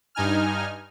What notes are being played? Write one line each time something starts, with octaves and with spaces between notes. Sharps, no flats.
G2 D#4 G#5 F6